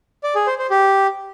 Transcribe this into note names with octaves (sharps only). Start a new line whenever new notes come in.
D5
G#4
C5
C5
G4